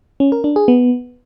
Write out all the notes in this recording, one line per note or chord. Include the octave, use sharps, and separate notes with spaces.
C#4
A#4
D4
G#4
B3